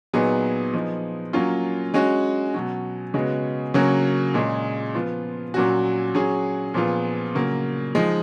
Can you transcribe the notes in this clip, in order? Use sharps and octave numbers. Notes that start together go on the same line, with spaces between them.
A#2 F#3 B3 D#4 G#4
F3 B3 D#4 G#4
F#3 A#3 C#4 F4
G#3 C#4 F#4
B2 F#3 C#4
C#3 G#3 B3 F#4
C#3 F#3 A#3 C#4 F#4
A#2 G#3 C#4 G#4
F3 B3 F4
A#2 F#3 C#4 F#4
F#3 C#4 G#4
A#2 F3 B3 F4 G#4
C#3 F#3 A#3
F3 G#3 D#4